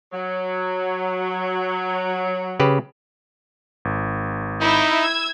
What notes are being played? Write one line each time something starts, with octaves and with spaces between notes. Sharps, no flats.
F#3
C#3 G4 B4
G#1
D#4 E4 B5 G6
E6 G#6